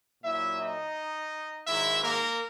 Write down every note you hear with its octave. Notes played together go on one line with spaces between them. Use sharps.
A#2 F#3 E4 E5
D#4 D#5
G#2 D#3 F#3 E4 E5
A#3 A#4